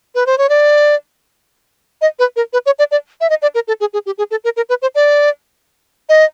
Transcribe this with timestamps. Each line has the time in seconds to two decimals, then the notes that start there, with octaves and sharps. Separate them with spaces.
0.15 B4
0.26 C5
0.38 C#5
0.49 D5
2.02 D#5
2.19 B4
2.36 A#4
2.53 B4
2.66 C#5
2.79 D5
2.91 D5
3.21 E5
3.30 D#5
3.42 D5
3.55 A#4
3.68 A4
3.80 G#4
3.93 G#4
4.06 G4
4.18 G#4
4.31 A4
4.44 A#4
4.57 A#4
4.69 B4
4.82 C5
4.95 D5
6.09 D#5